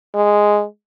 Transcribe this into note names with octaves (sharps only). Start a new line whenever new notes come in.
G#3